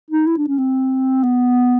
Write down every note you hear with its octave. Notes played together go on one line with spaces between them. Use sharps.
D#4
E4
D4
C#4
C4
B3